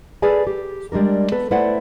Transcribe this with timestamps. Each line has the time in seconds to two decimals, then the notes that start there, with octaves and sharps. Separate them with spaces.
0.22 G#4 A4 B4 D5 G#5
0.47 G4
0.92 G3 G#3 D4 A#4
1.31 B3 A4 B4
1.51 A3 E4 B4 C5 D5 F#5